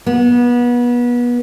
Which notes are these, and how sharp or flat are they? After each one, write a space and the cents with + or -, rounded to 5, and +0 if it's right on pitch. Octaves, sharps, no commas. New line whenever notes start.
B3 -30